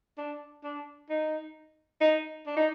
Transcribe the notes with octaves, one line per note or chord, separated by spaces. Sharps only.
D4
D4
D#4
D#4
D4
D#4